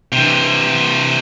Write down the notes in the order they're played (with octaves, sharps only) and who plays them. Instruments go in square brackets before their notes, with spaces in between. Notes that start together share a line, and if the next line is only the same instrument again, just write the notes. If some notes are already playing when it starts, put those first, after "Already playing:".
[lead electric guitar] C3 E3